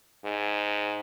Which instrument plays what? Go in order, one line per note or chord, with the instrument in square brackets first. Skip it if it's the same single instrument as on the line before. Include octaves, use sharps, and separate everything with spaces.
[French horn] G#2